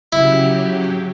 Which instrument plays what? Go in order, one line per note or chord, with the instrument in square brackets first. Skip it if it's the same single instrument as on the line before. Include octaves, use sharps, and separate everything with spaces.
[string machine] C#3 F#3 G4 [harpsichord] E4